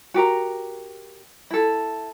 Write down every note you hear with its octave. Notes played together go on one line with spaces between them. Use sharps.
F#4 G4 A#4 A#5
E4 A4